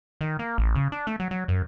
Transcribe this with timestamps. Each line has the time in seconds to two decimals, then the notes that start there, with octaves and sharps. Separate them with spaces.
0.21 D#3
0.39 A#3
0.58 A1
0.75 C#3
0.92 D4
1.07 A3
1.20 F#3
1.31 F#3
1.48 F#2